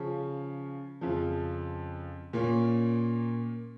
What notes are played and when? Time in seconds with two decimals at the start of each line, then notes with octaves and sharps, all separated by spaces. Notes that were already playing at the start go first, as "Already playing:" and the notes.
Already playing: C#3 F3 C#4
1.01 F2 C#3 F3
2.33 A#2 A#3 C#4